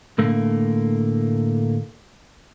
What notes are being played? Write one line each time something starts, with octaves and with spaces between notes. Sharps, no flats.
A2 D3 A3 A#3